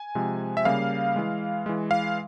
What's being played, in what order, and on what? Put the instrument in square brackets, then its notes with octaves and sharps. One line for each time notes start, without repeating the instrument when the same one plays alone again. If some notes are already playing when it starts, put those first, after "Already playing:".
Already playing: [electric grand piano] G#5
C3 F3 G#3
E5
C#3 G3 A#3 F5
E3 G#3
E3 G#3
F5